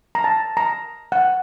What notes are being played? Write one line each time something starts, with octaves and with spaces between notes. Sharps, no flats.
A#5
A5
A#5
F#5